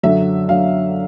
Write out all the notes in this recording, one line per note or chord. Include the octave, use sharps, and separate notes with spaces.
F#2 D3 F#3 E5
D3 F#3 F5